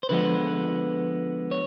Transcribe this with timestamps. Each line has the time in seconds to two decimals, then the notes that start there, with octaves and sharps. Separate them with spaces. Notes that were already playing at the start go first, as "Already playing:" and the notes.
0.03 C5
0.09 D3 F3 G#3 B3 B4
1.51 C#5